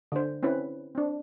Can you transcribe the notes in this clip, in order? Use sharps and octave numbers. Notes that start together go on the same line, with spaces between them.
D3 C5
C4 C#4 E4 B4
C4 D4